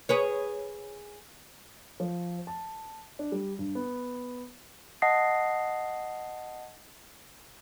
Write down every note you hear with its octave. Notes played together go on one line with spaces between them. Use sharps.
G#4 B4 C#5
F3
A5
D4
G3
G2
B3
D#5 F#5 A5 D#6 A#6 C7